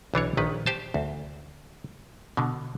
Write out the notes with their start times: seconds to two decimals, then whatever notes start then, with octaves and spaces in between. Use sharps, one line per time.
0.14 B1 E3 D4 C#5
0.37 A#1 D#3 B4
0.66 G4 C5 A5
0.94 D2
2.37 B2 D3